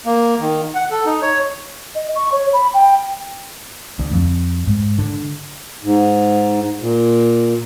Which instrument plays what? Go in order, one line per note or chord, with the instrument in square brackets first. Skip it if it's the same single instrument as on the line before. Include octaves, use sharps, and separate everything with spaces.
[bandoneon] A#3
D#3
F#5
A4
D#4
C#5
[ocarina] D#5
C#6
C#5
B5
G5
[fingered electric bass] D2
F2
G#2
D3
[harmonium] G#2
A#2